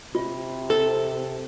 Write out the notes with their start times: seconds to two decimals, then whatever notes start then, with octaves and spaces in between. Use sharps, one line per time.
0.15 C3 F4
0.70 A4